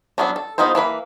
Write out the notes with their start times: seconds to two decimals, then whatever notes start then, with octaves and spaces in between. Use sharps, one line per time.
0.18 F#3 A#3 B3 C#4 D4
0.36 A4
0.58 B3 D#4 F4 G#4 C5
0.75 E3 A#3 B4 B5